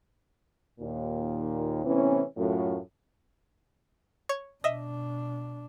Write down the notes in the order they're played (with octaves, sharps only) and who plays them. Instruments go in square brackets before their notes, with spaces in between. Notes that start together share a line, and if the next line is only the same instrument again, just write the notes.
[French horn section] D#2 A#2
A2 C3 E3 B3 C#4
F#2 A2 F4
[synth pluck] C#5 C#6 G#6
[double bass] B2 D4 [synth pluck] D#5 E5